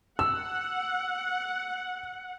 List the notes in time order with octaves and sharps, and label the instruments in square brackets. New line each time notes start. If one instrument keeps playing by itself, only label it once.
[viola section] F#5 [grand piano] E6